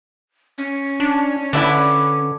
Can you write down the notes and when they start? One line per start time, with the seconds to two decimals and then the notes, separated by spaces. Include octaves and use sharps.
0.58 C#4
1.00 D4
1.53 D3 D4 E4 B4